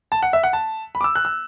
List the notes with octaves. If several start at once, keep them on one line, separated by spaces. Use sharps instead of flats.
A5
F#5
E5
F#5
A5
B5
D6
E6
F#6
E6